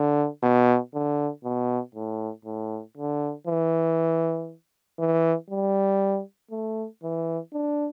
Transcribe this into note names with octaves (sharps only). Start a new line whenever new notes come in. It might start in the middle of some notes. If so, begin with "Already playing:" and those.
Already playing: D3
B2
D3
B2
A2
A2
D3
E3
E3
G3
A3
E3
D4